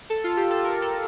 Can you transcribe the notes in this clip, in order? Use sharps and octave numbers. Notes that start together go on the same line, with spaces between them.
A4
F4
G4
A4
A#4
A4